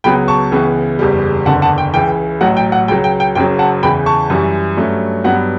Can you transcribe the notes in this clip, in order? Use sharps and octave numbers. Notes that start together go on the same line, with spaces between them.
C#2 C#3 F#3 B3 G5 B5
A5 C#6
C#2 C#3 E3 B3
F#1 E2 C#3 G3
F#1 E2 D3 F#5 A5
F#5 A5
G5
C#2 C#3 E3 G5
A1 A2 F#3 F#5
G5
F#5
C#2 C#3 F#3 G5
G5
G5
F#1 F#2 C#3 F#3 G5
F#5 A5
E2 C#3 E3 G5 B5
A5 C#6
F#2 E3 G3
G2 F#3 A3 C#4
G2 F#3 B3 F#5